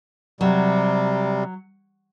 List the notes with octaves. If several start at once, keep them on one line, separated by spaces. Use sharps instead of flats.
C3 F#3 G3